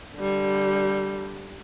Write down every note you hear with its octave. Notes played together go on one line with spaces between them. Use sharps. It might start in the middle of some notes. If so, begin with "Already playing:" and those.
D3 G3